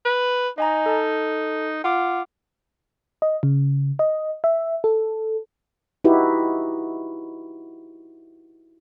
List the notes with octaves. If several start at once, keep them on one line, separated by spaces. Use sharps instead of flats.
B4
D#4 D#5 G#5 A#5
A4 A5
F4 F#5 D6
D#5
C#3
D#5
E5
A4
D#4 E4 F#4 G4 B4